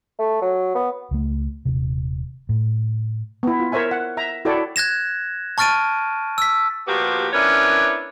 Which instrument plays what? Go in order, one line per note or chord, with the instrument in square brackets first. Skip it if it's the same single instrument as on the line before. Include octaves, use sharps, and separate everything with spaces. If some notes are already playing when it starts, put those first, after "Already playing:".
[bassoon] A3
F#3
B3
[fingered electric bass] C#2 A3
D#1 C3
A2
[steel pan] B3 E4
F4
A#4 C5 C#5 E5 G#5
F#5
E5 A#5
E4 F#4 A4 C#5 D5 G5
[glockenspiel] F#6 G#6 A#6 E7
A5 C#6 F6 A6 D7 D#7
E6 B6
[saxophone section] A#2 F3 B3 F#4 G4
B3 C#4 D4 E4 A#4 C#5